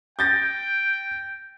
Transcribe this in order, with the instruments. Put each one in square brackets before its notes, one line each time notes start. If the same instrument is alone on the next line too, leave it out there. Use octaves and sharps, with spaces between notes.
[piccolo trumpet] G5 [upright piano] G6 A6 A#6